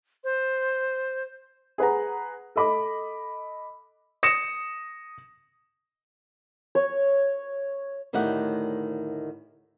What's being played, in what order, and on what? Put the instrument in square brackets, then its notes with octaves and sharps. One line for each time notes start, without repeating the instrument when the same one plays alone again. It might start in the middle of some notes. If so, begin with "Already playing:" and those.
[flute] C5
[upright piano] G#4 B4 F#5 A#5
A4 D#5 B5 D6
[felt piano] D#6 A#6 C#7 E7
[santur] C#5
[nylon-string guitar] D2 A2 D#3 G4 C#5 F#5